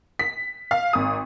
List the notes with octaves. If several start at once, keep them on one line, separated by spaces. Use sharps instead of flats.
B6
F5
G#1 D#6